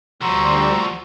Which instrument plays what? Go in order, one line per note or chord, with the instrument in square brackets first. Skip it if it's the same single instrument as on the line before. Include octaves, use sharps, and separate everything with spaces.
[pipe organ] D2 G3 [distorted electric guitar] F3 F#4 [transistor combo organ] A#5 C6 E6 [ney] C#6